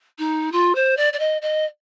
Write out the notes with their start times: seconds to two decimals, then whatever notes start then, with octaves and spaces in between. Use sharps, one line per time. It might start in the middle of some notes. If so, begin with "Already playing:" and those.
0.18 D#4
0.52 F4
0.75 C5
0.96 D5
1.13 D5
1.19 D#5
1.41 D#5